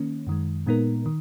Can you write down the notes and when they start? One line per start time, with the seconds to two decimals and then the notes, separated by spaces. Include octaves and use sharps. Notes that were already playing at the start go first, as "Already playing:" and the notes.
Already playing: D#3 A#3 C#4
0.27 F#2 D#3 G#3
0.66 A#2 G#3 B3 D#4 A#4
1.06 D#3